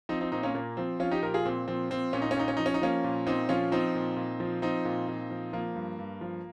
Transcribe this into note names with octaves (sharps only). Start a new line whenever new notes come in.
F3 C4 D#4
C4 D#4
A#2 C4 D#4
A#3 C#4
A#2 A#3
F3 C4
F3 C#4 F4
D#4 G4
A#2 G4 A#4
F4 G#4
A#2 C4
F3 C4
F3 C4
A#2 C#4
D#4
C#4
A#2 D#4
C#4
F3 D#4
C#4
D#4
F3 A#3 C#4
A#2
A#2 C4 D#4
F3 C#4 F4
F3 C4 D#4
A#2
A#2
F3
F3 C4 D#4
A#2
A#2
F3
F3 A#3
G2
G2
F3